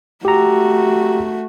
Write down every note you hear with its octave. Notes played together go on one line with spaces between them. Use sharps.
A3 F#4 G4 A#5